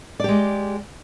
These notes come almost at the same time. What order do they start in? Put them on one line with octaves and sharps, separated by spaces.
D5 G4 G#3